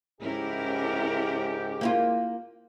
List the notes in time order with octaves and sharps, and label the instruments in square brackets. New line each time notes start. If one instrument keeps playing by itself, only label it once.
[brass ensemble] C#2 G#2 G4 [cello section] C#4 E4 A#4
[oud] A#3 E4 F4